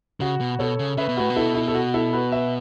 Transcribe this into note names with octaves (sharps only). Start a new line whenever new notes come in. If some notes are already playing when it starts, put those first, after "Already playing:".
C#3 F#4
B2
B2 A4 C#5
C#3
C#3 B4 E5
B2
A2 F#4 B4
B2
E4 A4
E4
A4
F#4
E4 A4
F#4 B4
B4 E5